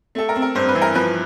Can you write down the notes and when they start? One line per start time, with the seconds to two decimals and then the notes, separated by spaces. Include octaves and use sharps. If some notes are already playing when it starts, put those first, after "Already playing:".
0.15 A3 A4
0.29 A#4
0.36 C4
0.42 A#4
0.55 G2 C5
0.69 B4
0.75 E3
0.82 A#4
0.95 F3 B4